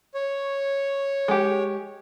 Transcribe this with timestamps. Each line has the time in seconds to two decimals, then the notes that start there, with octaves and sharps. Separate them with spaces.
0.15 C#5
1.28 G#3 G4